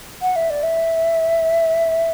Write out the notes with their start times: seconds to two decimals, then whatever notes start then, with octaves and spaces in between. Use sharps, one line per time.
0.21 F#5
0.35 E5
0.50 D5
0.63 E5